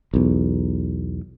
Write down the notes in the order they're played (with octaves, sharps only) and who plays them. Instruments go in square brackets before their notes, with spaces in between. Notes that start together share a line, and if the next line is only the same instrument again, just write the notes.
[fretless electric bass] B1 E2